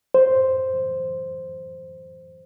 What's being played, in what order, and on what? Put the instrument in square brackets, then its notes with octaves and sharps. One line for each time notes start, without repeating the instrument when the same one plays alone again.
[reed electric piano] C5